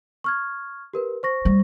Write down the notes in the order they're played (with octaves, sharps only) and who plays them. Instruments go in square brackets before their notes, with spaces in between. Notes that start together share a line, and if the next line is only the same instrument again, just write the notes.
[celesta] C#6 F6 G#6
G4 A#4 B4
C5 C#6 A#6
[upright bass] G3